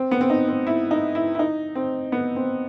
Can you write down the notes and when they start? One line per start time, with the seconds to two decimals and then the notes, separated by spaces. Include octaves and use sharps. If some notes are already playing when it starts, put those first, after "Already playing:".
Already playing: C4
0.11 B3
0.21 C4
0.30 D#4
0.48 C4
0.67 E4
0.91 D#4
1.15 E4
1.35 E4
1.39 D#4
1.75 C4
2.12 B3
2.36 C4